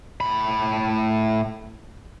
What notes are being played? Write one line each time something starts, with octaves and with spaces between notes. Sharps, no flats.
A2 B5